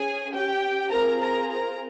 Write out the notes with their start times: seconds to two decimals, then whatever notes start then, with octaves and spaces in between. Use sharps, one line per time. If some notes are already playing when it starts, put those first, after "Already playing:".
Already playing: C#4 G#4 G#5
0.33 G4 G5
0.91 C4 F4 G#4 A#4 A#5
1.20 A#4 A#5
1.50 A#4 A#5